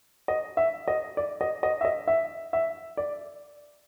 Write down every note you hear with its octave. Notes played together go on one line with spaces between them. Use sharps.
D#5
E5
D#5
D5
D#5
D#5
E5
D#5
E5
E5
D5